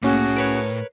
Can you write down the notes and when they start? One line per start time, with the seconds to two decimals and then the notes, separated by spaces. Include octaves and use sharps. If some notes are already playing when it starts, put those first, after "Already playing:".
0.03 C2 A2 A#3 C#4 F#4 G#4
0.36 A#4 B4 C#5